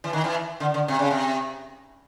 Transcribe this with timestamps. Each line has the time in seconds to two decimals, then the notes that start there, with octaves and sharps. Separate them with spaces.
0.04 E3
0.13 D#3
0.24 E3
0.60 D3
0.74 D3
0.88 C3
0.99 C#3
1.10 C3